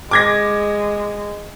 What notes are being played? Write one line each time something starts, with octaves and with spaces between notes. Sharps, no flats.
G#3 D6 G#6 A#6